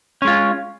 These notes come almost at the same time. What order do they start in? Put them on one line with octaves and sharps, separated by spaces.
C#4 G#3 F4